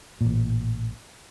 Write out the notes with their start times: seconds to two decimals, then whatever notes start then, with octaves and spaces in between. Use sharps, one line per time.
0.21 A1 A#2